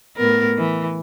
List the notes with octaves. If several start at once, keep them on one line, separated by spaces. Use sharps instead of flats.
A2 B3 A#4
E3